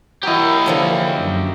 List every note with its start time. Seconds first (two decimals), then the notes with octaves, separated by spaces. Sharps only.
0.23 F#3 E4 G4 A#4 D#5
0.66 D3 F3 C#4
1.16 F#2